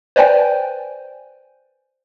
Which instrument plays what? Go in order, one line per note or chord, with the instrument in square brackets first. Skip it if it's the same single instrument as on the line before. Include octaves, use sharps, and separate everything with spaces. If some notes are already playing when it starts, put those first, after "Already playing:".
[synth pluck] B4 C5 D5 G5 G#5